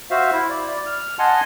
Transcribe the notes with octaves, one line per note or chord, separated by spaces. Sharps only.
F#4 C5 E5 F5
E4
D5
F6
D#5 F#5 G#5 A5 C6